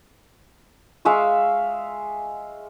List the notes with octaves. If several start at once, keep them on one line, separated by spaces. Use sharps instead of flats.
G#3 E5 F5 C#6